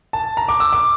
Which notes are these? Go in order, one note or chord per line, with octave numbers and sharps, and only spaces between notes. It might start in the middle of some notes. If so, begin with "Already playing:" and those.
A5
A#5
D6
E6
D6